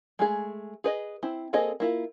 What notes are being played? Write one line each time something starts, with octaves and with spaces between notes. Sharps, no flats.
G#3 A3 G#4
G#4 B4 D#5
C4 E4
A#3 C4 G#4 A4 D#5
A#3 E4 F4